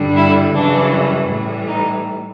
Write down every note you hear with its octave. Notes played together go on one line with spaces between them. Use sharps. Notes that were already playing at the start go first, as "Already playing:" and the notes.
Already playing: G2 D3 G3
E4
F#2 C#3 E3 G3 D4
A2 E3 G3
D#4